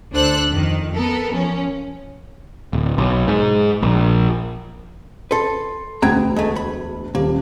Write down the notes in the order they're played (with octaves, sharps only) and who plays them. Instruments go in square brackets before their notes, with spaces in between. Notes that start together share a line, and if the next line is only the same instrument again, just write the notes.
[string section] D2 D4 A4 C5 E6 F#6
F2 D#3
B3 A4 A#4
F3 C#4
[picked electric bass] D1
B1
G#2
A#1
[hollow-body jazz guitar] A4 B4 [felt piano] C6
[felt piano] E1 D2 G#6 [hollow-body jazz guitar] B3 G5 A#5
[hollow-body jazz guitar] G#3 A3
B5
[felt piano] D#1 [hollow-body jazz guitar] A#3